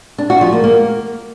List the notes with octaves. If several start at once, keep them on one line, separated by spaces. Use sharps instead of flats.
D4
F#4
F3
A#3
A#3